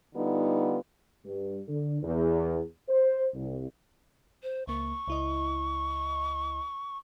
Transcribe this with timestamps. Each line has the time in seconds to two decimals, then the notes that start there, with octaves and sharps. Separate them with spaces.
0.15 D3 G3 B3 D#4 F4
1.25 G2
1.68 D3
2.03 E2
2.88 C5
3.34 C2
4.43 C5
4.67 C#2 A#3 C#6
5.08 C#2 E4 D#5